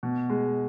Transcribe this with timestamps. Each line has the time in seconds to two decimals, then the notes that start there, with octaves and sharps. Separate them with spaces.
0.03 B2
0.30 G#3